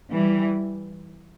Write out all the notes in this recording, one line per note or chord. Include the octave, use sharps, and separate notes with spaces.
E3 G3